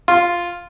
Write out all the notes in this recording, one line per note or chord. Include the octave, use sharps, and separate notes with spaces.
F4